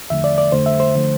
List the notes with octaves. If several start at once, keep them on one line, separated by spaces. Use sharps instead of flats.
E2 D3 F3 A3 E5
D5
D5
F2 D3 A3 C5
E5
C5
D3 F3 A3